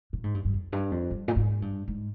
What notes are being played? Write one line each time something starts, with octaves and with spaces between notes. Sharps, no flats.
A#2
G#2
G2
G2
F2
G2
F2
G2
A#2
G#2
G2
G#2